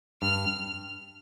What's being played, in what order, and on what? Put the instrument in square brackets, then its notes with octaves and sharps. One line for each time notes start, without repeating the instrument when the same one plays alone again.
[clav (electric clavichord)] G2 [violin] F6